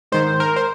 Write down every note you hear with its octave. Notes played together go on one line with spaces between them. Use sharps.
G#2 D#3 C5
A#4
C5